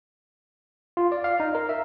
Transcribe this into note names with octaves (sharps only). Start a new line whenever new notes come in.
F4
D5
F5
D#4
A#4
E5